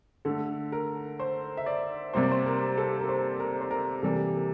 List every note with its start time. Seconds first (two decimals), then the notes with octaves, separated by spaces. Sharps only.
0.25 D3 A3 A4
0.72 A#4
1.20 C5
1.57 E5
1.66 D5
2.14 C3 G3 A#3 C5
2.23 D5
2.31 C5
2.46 A#4
2.78 A4
2.99 A#4
3.08 C5
3.40 A#4
3.61 C5
3.71 A#4
4.02 C3 E3 G3 A#3 A4
4.34 A#4